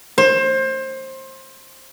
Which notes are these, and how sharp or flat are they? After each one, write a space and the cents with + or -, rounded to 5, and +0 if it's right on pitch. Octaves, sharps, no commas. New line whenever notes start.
C5 +25